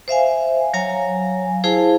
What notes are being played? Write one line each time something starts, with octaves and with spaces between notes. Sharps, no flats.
C5 E5 F5 G#5
F#3 C#5 F5 G#5 A#5
E4 G#4 C5 F5 A5